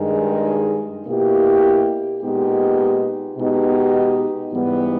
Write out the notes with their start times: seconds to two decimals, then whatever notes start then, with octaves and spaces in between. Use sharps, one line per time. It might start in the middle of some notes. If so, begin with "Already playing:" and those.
Already playing: G2 D#3 G#3 D#4 G#4
1.06 B2 A#3 E4 G4
2.22 A#2 G#3 B3 D#4 G4
3.38 B2 G#3 B3 D#4 G4
4.53 G#2 E3 G3 B3